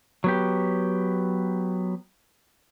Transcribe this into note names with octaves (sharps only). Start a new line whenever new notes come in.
F#3 B3 G4